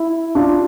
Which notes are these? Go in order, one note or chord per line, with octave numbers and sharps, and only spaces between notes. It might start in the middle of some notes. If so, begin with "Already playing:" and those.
Already playing: E4
D4 F4